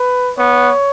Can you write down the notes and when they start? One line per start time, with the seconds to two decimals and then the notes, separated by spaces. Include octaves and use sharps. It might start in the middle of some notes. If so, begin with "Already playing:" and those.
Already playing: B4
0.39 B3 C#5